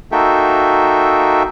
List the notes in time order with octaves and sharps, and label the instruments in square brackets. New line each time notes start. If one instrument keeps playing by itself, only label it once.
[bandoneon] A#3 D#4 F#4 A4 E5 G5